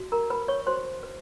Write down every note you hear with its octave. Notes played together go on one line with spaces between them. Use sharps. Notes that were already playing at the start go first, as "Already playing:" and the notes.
Already playing: F#4
A#4 A#5
B4 B5
C#5 C#6
F#4 C5 C6
B4